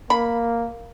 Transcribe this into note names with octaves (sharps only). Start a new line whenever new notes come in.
A#3 B5